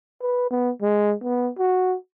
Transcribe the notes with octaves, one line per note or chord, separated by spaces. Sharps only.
B4
B3
G#3
B3
F#4